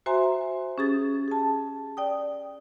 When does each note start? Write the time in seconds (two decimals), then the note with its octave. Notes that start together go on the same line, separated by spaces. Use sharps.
0.06 F#4 C5 E5 G#5 A#5 C6
0.78 C#4 G4 G#4 D#6 A6
1.28 G#4 A5
1.97 D5 G5 D#6